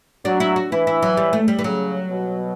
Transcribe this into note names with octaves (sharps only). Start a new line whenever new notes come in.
F#3 D4
E4
F#4
E3 E4
E4
F#3
G3
A3
G3
E3
C#3 F#3
B2